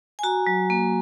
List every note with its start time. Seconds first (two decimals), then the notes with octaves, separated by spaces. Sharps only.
0.19 G#5
0.23 F#4 A#5
0.47 F#3
0.70 A#3